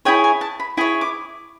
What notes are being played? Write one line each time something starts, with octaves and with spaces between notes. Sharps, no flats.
E4 G#4 C#5 G5
G#5
A5
B5
E4 G#4 C#5
D6